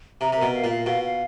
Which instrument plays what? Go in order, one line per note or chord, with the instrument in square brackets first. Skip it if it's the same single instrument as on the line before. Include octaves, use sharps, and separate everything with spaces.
[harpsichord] C3 [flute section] A#5
[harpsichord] C3 [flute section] A#4
[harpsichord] B2
[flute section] F5
[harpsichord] A#2
[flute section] F5
[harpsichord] B2 [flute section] F5
[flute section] F5